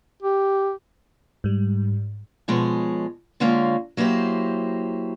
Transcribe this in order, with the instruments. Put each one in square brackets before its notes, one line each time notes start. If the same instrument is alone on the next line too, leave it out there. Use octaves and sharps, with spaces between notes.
[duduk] G4
[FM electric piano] G#2 G3
[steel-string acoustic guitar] B2 F3 G#3 C#5 G#5
D3 G#3 A#3 C#4 F4
F#3 A#3 E4 G4 C5